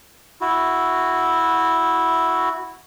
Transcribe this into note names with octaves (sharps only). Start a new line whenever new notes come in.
E4 F#4